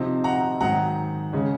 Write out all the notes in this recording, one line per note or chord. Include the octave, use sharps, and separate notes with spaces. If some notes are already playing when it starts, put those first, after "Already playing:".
Already playing: C3 F3 C4 D#4
F#5 A#5
G#2 D#3 F#3 F#5 A#5
C#3 G#3 C#4